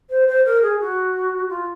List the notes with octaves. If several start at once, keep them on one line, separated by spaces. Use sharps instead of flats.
C5
C5
A#4
G#4
F#4
F4